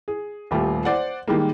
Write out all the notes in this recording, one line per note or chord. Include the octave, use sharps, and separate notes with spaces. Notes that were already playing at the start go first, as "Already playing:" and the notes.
G#4
D#1 G3 A3 F4
C5 D5 F#5
D#3 G3 G#3 A#3